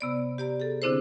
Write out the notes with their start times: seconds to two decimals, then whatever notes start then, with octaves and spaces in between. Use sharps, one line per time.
0.01 C3 B3 D5
0.38 G4 D5 A#5
0.60 G#4 A4
0.82 D3 C4 D4 E4 G#4 C5